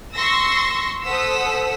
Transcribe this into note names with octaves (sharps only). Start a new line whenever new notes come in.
C6 C#6 E6 A#6
A4 C5 F#5 D#6 E6 B6